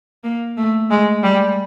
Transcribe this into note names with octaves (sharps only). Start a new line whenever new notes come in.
A#3
A3
G#3
G3